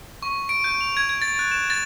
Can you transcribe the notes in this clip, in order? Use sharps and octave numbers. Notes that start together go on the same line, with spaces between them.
C#6
D7
G6
F7
G#6
G#6
A6
F#6
E7
A6